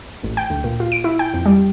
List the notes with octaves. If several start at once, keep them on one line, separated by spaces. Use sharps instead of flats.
A1
G5
D2
A#2
F4
D7
E4
G5
F2
G3